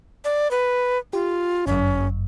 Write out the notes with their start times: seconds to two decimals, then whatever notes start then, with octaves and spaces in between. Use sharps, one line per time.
0.25 D5
0.51 B4
1.13 F4 G4
1.67 G1 F#2 C#4